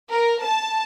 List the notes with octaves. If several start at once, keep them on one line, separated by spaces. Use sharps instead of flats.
A#4
A5